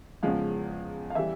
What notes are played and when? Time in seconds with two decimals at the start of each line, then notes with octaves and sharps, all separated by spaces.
0.23 E2 C#3 F3 G#3 F5
1.10 F5
1.15 E3 G3 E5